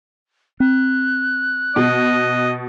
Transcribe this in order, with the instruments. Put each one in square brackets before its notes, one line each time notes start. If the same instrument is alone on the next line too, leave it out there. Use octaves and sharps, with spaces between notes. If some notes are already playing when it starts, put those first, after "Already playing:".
[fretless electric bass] C4 [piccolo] F#6
[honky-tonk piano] B2 [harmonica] D#5